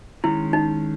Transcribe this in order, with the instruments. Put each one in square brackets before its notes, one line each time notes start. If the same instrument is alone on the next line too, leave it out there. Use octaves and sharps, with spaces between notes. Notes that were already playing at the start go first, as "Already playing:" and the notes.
[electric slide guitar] D#3 G#3 C#4 [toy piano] E4
[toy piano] D#4